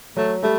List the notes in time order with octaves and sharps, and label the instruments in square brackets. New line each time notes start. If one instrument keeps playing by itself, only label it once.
[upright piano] F#3 [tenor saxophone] A3
[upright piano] G3 [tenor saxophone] A3